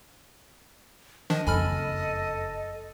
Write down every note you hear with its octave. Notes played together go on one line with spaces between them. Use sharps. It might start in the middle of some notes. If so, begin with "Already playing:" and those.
D#3 F3 D4 D#5
F#1 F2 A4 G#5 B5 F6